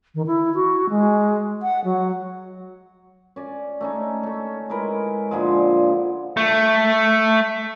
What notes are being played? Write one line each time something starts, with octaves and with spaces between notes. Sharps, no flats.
D#3
E4
F#4
G#3
F#5
F#3
C#4 D5
A3 C#4 D#4
C#4 A4
G#3 E4 A#4 B4
A#2 D3 F3 G#3
A3